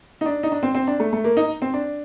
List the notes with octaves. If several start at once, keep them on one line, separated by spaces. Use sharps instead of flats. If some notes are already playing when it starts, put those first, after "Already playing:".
D#4
D4
D#4
D4
C4
C4
D4
A3
A3
A#3
D#4
C4
D4